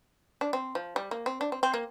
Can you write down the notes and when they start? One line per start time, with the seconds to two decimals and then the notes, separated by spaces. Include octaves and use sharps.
0.41 D4
0.53 C4
0.75 F3
0.96 G3
1.11 A#3
1.26 C4
1.41 D4
1.52 C4
1.63 C4
1.74 A#3